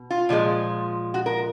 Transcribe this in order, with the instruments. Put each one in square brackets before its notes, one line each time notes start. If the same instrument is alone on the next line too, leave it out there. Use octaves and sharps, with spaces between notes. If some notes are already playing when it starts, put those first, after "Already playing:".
Already playing: [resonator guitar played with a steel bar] B2
F4
A#2 F3 G#3
F#4
A#4